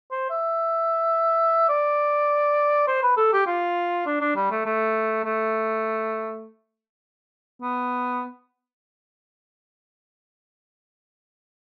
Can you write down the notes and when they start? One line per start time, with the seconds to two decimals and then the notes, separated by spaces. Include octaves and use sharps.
0.12 C5
0.30 E5
1.69 D5
2.88 C5
3.03 B4
3.17 A4
3.33 G4
3.47 F4
4.06 D4
4.21 D4
4.36 G3
4.51 A3
4.66 A3
5.24 A3
7.62 B3